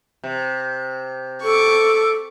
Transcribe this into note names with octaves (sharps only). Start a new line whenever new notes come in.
C3
A4 C#6 D6